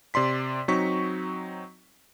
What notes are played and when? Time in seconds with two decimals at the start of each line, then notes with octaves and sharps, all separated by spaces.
0.14 C3 D5 C6 B6
0.68 F#3 C4 D#4 C#6 B6